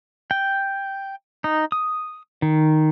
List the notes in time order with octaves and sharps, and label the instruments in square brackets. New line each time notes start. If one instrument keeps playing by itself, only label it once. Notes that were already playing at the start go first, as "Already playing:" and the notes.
[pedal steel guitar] G5
D#4
D#6
D#3